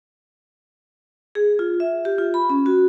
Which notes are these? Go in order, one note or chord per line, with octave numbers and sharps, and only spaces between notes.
G#4
F4
E5
G4
F4
B5
C#4
F#4